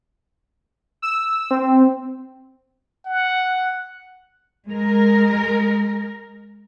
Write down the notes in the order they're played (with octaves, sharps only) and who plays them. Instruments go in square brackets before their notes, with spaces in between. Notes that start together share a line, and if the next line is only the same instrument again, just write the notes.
[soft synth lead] E6
C4
[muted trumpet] F#5
[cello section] G#3 A#4